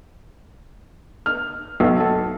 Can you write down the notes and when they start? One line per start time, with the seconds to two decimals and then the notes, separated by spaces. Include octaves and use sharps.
1.26 F6
1.80 B1
2.00 A4